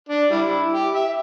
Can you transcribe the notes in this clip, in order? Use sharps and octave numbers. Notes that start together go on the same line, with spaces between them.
D4
G3 E4
G4
E5